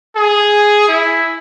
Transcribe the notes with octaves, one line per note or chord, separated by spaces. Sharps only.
G#4
E4